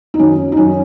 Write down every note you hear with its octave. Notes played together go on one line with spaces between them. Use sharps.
D#4
F#2 D#3 F#3 C#4
D#4
F#2 D#3 F#3 C#4